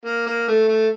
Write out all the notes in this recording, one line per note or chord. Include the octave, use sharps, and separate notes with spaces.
A#3
A#3
A3
A3